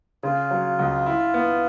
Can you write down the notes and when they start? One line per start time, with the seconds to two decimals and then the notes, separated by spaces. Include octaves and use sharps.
0.23 C#3 F4
0.51 F#3
0.79 C#2
1.06 E4
1.34 B3